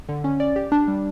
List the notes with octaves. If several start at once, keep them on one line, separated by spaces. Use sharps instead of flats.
D3
C#4
D5
G4
D4
G3